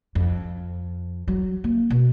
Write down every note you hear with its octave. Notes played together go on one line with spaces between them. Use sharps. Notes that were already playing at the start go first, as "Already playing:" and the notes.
F2
F#3
A#3
B2